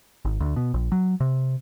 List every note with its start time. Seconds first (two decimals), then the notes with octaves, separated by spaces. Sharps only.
0.25 G#1
0.40 D2
0.56 B2
0.74 A#1
0.92 F#3
1.20 C3